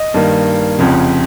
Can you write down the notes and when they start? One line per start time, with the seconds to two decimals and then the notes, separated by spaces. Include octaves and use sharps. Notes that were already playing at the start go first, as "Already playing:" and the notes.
Already playing: D#5
0.14 G2 D#3 A#3
0.79 F1 F2 C#3